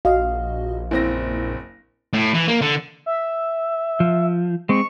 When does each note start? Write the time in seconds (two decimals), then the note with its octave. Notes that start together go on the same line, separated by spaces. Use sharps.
0.05 A#1 F#4 D#5 F5
0.91 F#1 C4 E4 A#6
2.14 A2
2.34 E3
2.48 A#3
2.62 D3
3.06 E5
4.00 F3
4.69 G#3 C4 C#6